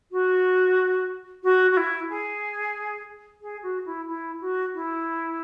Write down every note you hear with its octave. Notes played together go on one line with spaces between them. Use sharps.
F#4
F#4
F#4
E4
G#4
G#4
F#4
E4
E4
F#4
E4